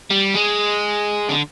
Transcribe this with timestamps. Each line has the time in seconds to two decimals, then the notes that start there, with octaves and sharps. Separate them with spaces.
0.11 G3
0.35 G#3
1.29 D3